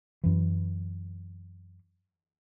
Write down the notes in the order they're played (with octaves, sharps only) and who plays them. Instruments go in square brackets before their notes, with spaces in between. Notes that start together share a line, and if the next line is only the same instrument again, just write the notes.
[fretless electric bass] F#2 E3